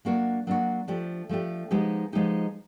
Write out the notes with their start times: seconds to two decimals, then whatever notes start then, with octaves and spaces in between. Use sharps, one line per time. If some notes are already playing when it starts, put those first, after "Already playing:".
0.05 F#3 A#3 D4 F#4
0.47 F#3 A#3 D4 F#4
0.88 F3 A3 D4 G4
1.29 F3 A3 D4 G4
1.71 F3 G#3 B3 D#4 G4
2.13 F3 G#3 B3 D#4 G4